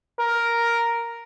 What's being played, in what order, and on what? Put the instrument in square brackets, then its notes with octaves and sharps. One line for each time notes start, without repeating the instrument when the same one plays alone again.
[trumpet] A#4